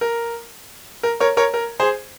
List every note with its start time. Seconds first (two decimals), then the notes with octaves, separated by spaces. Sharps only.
0.01 A#4
1.03 A#4
1.20 A#4 C#5
1.37 A#4 C#5
1.54 A#4
1.80 G#4 C5